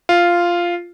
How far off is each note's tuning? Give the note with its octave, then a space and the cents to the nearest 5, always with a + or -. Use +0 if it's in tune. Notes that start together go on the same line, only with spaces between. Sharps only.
F4 -5